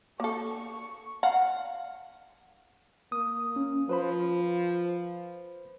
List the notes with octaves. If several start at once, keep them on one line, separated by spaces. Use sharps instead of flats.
A#3 A4 C#6
F5 F#5
A#3 D#6
C#4
F3 B4 C5 B5